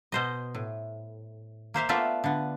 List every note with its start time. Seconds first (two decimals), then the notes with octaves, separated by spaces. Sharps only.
0.12 B2 C5 D#5
0.55 A2
1.74 A#3 C5 E5 F5
1.89 A3 B3 F4 D5 E5 F5
2.24 D3 B3